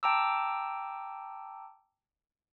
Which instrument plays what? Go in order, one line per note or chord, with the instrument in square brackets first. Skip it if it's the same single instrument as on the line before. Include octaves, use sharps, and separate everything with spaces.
[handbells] G5 A5 A#5 D6 E6